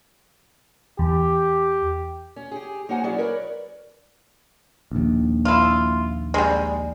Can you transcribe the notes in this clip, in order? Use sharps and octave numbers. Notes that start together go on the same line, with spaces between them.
E2 G4
C#4
G4 G#4
A#3 D#4 C5 C#5 F#5 G#5
F#3 C#4 E4 G#4 D5
A#4 B4 C#5 D5
A#1 D#2
E4 F4
G3 G#3